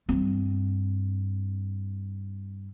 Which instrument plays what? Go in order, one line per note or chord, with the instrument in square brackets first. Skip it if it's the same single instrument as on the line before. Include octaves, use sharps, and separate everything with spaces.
[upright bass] G2 C4